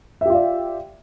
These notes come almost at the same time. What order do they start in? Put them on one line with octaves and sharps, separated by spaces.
E5 G4 F4 D5